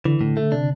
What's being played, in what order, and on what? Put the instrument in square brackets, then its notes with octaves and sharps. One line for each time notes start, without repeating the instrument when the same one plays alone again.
[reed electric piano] D3 [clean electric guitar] E3
[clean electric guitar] A2
A3
[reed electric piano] C3 [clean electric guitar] D4